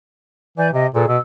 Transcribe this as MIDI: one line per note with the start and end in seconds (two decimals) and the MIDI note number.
0.58 0.69 52
0.58 0.68 74
0.58 0.68 80
0.58 0.68 91
0.73 0.87 48
0.73 0.86 75
0.95 1.05 46
0.95 1.07 68
0.95 1.07 69
0.95 1.07 71
1.08 1.18 47
1.08 1.20 88